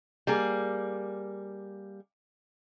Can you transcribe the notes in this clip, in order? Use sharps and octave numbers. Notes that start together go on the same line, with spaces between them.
G3 A#3 G#4